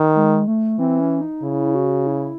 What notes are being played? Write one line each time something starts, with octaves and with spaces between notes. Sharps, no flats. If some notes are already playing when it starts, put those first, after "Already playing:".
Already playing: D#3
G#3
A3
E3 C4
C#4
D#4
C#3 E4
F#4
E4